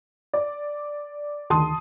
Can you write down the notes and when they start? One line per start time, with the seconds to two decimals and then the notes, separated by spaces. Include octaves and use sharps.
0.33 D5
1.50 D2 D#3 A5 C6 D#6